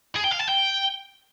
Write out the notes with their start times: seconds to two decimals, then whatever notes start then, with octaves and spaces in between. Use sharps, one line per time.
0.16 G#4
0.24 G5
0.32 F5
0.40 A5
0.48 G5